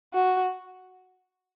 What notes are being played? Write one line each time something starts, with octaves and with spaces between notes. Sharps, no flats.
F#4